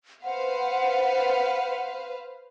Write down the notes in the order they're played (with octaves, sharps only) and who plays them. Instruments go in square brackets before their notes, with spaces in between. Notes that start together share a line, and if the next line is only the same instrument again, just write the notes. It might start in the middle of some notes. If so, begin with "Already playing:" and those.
[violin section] B4 C5 F5 [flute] F#5